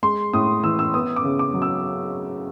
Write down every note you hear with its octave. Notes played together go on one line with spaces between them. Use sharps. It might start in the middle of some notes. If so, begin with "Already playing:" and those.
G#3 C6
A2 D#6
E3 E6
E6
B3 D#6
D6
C#3
D6
F#3
E6